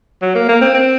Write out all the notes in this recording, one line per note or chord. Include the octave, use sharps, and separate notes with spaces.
F#3
A#3
A#3
C4
C4